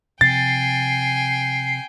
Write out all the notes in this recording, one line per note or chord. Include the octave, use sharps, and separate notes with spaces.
C3 F3 G5 G#5 A6 C7